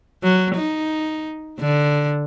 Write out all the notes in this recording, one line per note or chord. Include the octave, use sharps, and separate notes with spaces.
F#3
D#4
D3